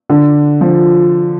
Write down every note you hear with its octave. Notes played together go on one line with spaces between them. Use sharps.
D3
F3